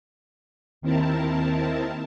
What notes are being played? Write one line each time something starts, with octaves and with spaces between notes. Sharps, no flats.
D#2 D#3 C4 E4 A#4 A5